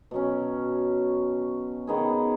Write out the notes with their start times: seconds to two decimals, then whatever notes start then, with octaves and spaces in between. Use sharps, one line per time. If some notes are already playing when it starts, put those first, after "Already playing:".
0.11 B2 F#3 C#4
1.87 D#3 B3 D#4 G#4